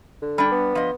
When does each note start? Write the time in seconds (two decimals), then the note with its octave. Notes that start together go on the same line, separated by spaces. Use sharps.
0.22 D3
0.38 G3 D4
0.52 B3
0.75 F3 D#5